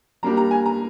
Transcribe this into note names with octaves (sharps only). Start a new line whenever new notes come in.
G3 A#3 D4 G4 A#5
A#5
G#5
A#5